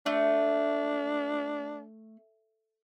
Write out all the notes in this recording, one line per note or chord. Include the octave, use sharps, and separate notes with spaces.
A3 D4